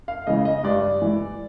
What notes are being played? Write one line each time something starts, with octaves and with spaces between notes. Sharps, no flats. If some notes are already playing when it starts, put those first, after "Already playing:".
F5
C#3 E3 D#5
D#5
G2 D5
E3